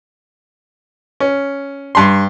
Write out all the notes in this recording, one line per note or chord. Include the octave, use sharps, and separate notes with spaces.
C#4
G2 C6